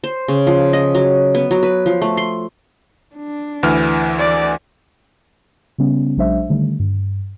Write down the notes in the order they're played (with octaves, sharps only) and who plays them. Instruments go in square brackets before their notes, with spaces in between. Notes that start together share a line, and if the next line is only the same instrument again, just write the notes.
[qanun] C5
C#3
F3
D#5
F#3
B3
F#3
B4
F3
A3
C6
[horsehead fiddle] D4
[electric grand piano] D2 E3 F6
[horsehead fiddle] D5
[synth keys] C#3 G3 B3 C#4
A#1 F#3 G#3 D4 C5 E5
D3 D#3 G3 A3
G2